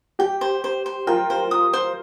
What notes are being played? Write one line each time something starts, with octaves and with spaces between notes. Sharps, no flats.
G4 G5
C5
C5
C5
F4 A#4 G5
C5
D#6
C5